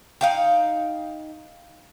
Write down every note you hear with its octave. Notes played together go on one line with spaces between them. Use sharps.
D#4 F5 G5